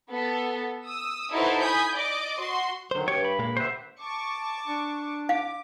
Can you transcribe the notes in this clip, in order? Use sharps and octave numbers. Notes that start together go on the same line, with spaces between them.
B3 A4
D#6 E6
D#4 E4 F#4 A4 B4 C5
G#5 B5 D#6 G6
D5 D#5 D6
F#4 C6
D3 D#3 F#3 C5
G2 G4 C#5
B5
A#2 G#3 A#3
D3 G4 B4 C5 E5
A5 C#6 D6
D4
F5 D6